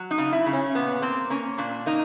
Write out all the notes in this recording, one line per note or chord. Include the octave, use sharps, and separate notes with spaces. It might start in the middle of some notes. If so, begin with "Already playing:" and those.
Already playing: F#3
D#4
C#3
E4
C#3
C#4
A#2 B3
A#3 C4
A#3 C#4
A#2 D4
A#3 D#4